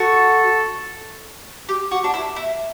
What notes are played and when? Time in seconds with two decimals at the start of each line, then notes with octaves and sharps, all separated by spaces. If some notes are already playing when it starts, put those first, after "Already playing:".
Already playing: F#4 A4
1.69 G4
1.91 F#4
2.04 D4
2.14 E4
2.36 E4